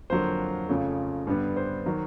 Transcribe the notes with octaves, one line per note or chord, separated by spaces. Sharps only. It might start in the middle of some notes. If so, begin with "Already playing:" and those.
F2 D3 F#3 A#3 C5
F2 C#3 F3 A3 C#5
G2 D3 G3 B3
C5
D#3 F#3